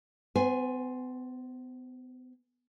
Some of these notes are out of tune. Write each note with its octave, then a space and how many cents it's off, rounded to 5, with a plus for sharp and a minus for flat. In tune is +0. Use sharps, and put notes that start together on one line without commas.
B3 +40 C5 +0 G#5 +0